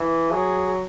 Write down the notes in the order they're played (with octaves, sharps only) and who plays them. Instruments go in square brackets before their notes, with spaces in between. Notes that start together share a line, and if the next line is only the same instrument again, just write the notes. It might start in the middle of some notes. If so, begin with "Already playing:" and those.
Already playing: [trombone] E3
[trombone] F#3 [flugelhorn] G#4